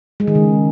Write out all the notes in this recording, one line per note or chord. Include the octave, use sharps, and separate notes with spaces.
G#3
D#3
C#3